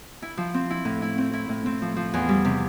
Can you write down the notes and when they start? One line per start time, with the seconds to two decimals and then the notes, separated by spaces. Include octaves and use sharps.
0.22 E4
0.37 F3
0.54 C4
0.70 E4
0.85 A2
1.02 E4
1.18 C4
1.33 E4
1.49 A2
1.66 C4
1.82 F3
1.96 F3
2.14 E2
2.29 G3
2.45 C3